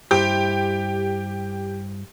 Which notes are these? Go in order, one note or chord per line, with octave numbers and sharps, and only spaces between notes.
G2 E4 G4 C5